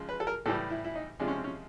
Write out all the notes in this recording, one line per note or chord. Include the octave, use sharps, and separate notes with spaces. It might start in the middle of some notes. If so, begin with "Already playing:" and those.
Already playing: C#3 F3 G#3
B4
A4
A#4
A2 E3 G3 A4
E4
E4
D#4
C3 F3 G#3 D4
C#4
C4
C#4